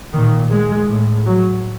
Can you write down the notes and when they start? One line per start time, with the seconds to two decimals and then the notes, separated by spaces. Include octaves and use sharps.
0.13 A#2 D#3
0.51 G#3
0.88 A2
1.27 F#3